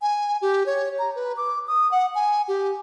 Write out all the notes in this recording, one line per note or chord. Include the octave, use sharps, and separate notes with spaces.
G#5
G4
C#5
A#5
B4
D6
D#6
F#5
G#5
G4